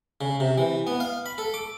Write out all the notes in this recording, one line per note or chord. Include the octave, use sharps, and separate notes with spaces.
C#3
C3
E3
B3
F5
B5
A4
D6